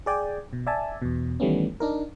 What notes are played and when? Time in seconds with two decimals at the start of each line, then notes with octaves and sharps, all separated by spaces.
0.06 G#4 D5 G5 G#5
0.53 B2
0.67 D5 E5 G#5 A5
1.02 E2 B2
1.40 D#3 E3 G3 A3 B3 C#4
1.80 D4 D#4 A#4